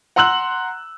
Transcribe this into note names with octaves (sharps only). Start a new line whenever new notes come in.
F#5 A#5 C6 E6 F#6 F#7